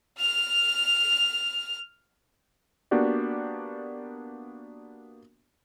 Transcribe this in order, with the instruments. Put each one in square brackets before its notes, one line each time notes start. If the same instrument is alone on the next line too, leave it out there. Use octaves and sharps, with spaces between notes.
[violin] F6 F7
[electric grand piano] A#3 B3 D4 F#4 G4 D5